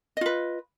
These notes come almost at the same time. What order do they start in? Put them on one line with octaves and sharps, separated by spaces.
D#5 F4 B4